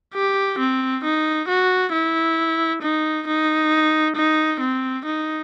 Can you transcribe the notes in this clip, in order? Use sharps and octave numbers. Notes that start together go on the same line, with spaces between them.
G4
C4
D#4
F#4
E4
D#4
D#4
D#4
C4
D#4